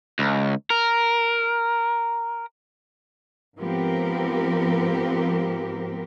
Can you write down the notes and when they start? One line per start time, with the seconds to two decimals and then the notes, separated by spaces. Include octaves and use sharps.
0.19 C#2
0.70 A#4
3.58 G#2 F3 B3 C4 G4 A#4